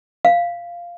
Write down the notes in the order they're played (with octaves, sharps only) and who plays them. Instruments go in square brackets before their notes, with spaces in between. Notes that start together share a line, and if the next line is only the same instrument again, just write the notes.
[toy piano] F5